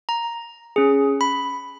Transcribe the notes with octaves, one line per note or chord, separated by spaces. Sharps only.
A#5
C#4 G#4
B5